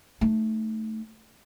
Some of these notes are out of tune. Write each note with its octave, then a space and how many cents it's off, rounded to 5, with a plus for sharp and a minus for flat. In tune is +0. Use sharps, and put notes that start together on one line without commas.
A3 +0 D#4 -5